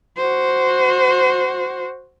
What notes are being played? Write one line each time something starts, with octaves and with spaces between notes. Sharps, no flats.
F#4 C5